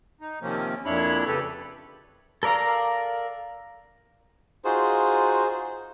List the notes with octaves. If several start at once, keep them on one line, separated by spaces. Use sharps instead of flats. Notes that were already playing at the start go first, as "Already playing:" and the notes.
D#4
C3 D#3 F3 A#3 C4 C#4
F2 A#2 D4 E4 C#5 B5
C#3 G4 A4 B4
A4 A#4 D5 F5 A#5
D#4 F4 F#4 G#4 C5